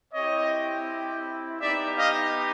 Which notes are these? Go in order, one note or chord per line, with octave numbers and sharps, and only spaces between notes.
C4 E4 G4 C#5 D#5
B3 D#4 G4 D5 E5
D#5 F5